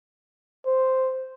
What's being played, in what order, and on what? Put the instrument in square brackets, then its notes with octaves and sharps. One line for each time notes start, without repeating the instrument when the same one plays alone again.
[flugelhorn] C5